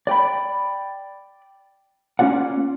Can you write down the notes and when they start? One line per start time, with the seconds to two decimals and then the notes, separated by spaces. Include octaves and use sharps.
0.07 D5 G5 B5
2.19 A#3 C#4 F4 D5 F#5